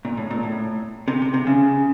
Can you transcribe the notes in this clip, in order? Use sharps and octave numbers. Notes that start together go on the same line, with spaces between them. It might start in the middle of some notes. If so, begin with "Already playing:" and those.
A#2
A2
A#2
A2
C3
C3
C3
C#3